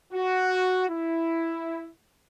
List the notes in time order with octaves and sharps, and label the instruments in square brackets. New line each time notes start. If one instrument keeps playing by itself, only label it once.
[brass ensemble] F#4
E4